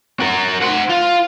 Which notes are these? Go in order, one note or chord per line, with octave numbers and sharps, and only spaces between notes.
F#4 A#4
C5 F#5
F4